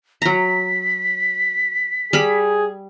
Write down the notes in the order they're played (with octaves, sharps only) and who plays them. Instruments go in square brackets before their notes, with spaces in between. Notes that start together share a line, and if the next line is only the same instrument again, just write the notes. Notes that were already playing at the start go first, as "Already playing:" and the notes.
[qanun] F#3 A#5 [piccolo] B6
[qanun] G3 B5 [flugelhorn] G#4